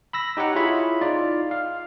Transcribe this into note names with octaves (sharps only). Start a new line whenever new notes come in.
B5 E6 A#6
D#4 G4 C#5 F#5 A#5
E4 F4 G#4 C#5 E5 B5
D#4 F4 D5
F5